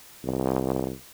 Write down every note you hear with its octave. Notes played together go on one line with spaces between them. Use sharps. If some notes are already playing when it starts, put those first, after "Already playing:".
C2